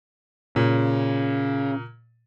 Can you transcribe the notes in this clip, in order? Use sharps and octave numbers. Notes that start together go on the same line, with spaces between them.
A#2 C#3